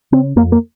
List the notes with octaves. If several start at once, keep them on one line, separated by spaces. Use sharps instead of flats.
C#3 C4
F2 A#3
A#3